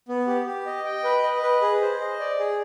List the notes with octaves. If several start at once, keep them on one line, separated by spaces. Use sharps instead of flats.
B3
G4
G4
D#5
G5
B4
D#5
B4
G#4
C5
D#5
D5
G#4